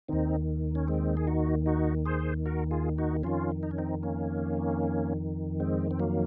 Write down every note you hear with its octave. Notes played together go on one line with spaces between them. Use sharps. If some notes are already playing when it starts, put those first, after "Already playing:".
D#2 D#3 C4 D#4
C#4
G#3 C4
G#4
D#4 F#4
D#4 F#4
G#4 C5
F#4 A#4
F4 G#4
D#4 F#4
F2 D#3 C#4 F4
D#4
C#4
C4 D#4
A#3 C#4
G#3 C4
C4
F#3 A#3